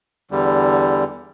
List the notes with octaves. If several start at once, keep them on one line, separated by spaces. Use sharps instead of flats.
E2 D3 G3